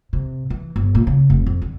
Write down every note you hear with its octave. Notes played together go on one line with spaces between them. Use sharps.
C3
E3
G1
A#2
C#3
F1
F2
D3